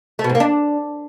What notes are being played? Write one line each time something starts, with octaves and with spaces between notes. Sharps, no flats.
A3
B2
G#2
A#3
D4